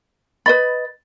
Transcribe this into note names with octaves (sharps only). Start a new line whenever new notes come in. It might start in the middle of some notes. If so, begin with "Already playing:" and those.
B4 D#5 B5 A6